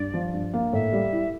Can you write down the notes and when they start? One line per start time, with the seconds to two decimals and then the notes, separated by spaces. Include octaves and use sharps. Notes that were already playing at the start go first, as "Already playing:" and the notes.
Already playing: G2 D5
0.14 F3
0.33 G2
0.53 A#3
0.72 A2 E5
0.92 G3
1.13 E4